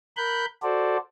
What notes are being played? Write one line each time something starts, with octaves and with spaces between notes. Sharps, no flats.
A#4 B5 F#6 G6
F#4 A4 C5 D5